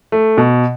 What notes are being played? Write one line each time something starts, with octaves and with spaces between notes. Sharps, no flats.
A3
B2